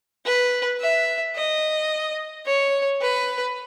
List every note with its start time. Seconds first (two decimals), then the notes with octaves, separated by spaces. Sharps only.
0.25 B4
0.80 E5
1.35 D#5
2.46 C#5
3.01 B4